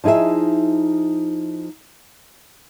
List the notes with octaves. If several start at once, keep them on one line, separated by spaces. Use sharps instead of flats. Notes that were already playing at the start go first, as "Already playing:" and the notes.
F3 D#4 E4 G#4 E5